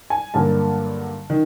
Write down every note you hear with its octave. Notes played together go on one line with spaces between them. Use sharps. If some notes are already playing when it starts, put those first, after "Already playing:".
G#5
G2 D3 F#3 A#3 A5
D#3